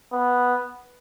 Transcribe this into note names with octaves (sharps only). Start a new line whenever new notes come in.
B3